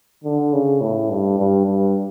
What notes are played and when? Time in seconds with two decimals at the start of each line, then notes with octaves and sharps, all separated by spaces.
0.24 D3
0.53 C#3
0.81 A2
1.10 G2
1.38 G2
1.66 G2